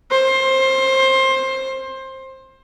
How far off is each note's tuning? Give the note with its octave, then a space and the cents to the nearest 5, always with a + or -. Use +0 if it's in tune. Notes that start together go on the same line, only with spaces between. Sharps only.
C5 +20